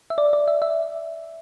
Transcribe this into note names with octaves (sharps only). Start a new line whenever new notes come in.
E5
D5
D5
E5
E5